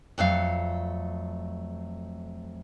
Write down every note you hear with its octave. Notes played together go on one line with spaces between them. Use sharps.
F2 F#3 A3 F5